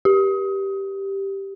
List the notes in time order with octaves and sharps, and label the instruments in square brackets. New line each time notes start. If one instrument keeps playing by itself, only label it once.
[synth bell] G4